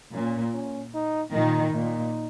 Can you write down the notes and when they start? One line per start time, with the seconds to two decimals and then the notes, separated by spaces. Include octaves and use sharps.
0.14 A#2 C#4
0.54 C#4
0.94 D#4
1.34 A#2 D#3 D#4
1.74 A#2 D#4